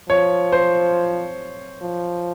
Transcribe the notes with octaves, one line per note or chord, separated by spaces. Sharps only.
F3 C#5
C5
F3